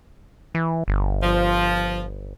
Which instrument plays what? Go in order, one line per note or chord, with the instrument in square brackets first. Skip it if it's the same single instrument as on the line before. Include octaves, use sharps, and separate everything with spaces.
[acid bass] E3
G1
[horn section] F3